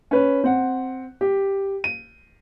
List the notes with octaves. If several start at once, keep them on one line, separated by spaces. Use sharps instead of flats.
C#4 B4
C4 F#5
G4
D#7